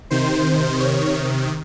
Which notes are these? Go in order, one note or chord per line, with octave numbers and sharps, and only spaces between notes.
C3 D#3 C5
C#5